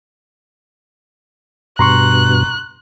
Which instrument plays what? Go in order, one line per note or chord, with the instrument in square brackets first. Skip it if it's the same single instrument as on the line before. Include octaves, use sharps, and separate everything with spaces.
[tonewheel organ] G2 B2 [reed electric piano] A#5 C6 C#6 [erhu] F#6